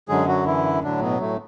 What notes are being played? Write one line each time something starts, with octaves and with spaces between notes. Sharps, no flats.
F#2 D3 F#3 G#3 G#4
F#3 F#4
E3 E4
A2 D3 F#3 D4
B2 B3
A2 A3